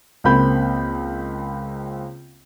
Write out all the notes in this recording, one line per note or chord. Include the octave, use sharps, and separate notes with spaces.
C#2 A#3 C4 B5 G6